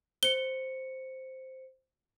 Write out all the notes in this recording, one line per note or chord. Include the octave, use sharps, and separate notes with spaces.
C5 C#7 G7